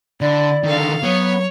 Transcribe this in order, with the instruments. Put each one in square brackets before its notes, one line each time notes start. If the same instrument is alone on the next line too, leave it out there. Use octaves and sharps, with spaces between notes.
[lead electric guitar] D3 [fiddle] E4 [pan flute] D5
[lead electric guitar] D3 D#3 [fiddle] A4 F5
[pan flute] F#3 [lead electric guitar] B3 [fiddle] C#5